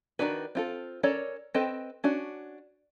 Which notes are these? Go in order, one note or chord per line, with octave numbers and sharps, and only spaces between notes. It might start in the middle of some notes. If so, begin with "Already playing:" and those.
D#3 F#3 D4 F#4 B4
C4 F4 A4
C#4 A4 A#4 C#5 D5
C4 A4 B4 D#5 G5
C#4 D4 F#4